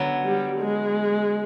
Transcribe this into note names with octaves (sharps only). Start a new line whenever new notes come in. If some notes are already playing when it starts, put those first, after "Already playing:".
Already playing: D3 F#3 B3
G3
G#3